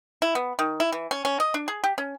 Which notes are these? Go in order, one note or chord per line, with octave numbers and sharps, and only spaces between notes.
E4
B3
D#3
E4
E3
C#4
C#4
D#5
D4
G#4
G4
C#4